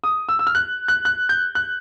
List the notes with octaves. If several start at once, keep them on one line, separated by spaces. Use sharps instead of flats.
D#6
E6
E6
F6
F#6
F#6
F#6
G6
F#6